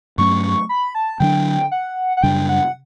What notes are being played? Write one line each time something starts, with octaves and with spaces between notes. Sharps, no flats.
G2 F#3 A3 C#4 C#6
B5
A5
D3 F#3 A3 D4 G5
F#5
F#5
F#2 C#3 G3 D4 G5
F#5